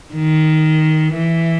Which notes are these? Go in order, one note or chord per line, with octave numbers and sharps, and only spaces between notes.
D#3
E3